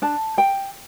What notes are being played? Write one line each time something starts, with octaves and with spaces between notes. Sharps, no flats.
D4 A5
A4 G5